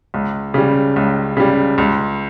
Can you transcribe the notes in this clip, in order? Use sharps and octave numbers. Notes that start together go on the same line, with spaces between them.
C#2
C#3 G3
C#2
C#3 G3
C#2